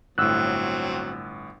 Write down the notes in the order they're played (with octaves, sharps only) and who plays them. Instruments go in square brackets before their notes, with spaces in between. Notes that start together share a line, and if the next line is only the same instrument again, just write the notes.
[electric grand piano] G1 A2 [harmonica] F#3 C4 [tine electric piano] E6 F#6